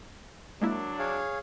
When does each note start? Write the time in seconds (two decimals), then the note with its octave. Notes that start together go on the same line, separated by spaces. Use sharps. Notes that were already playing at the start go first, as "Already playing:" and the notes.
0.62 F#3 G#3 A#3 D4 E4
0.99 G#4 C#5 F5